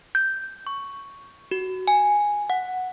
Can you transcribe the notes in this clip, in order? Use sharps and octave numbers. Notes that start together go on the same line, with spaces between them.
G6
C#6
F#4
G#5
F#5